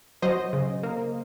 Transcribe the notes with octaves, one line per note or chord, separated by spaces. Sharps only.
F#3 C5 D#5
C#3
A#3